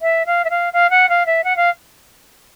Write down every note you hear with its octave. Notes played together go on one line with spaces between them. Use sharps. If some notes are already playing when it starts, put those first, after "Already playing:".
E5
F5
E5
F5
F5
F#5
F5
E5
F#5
F5